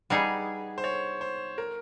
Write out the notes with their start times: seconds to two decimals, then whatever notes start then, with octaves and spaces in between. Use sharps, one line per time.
0.10 G3 B3 D#4 G#4
0.78 C5
0.84 C#5
1.21 C5
1.58 A#4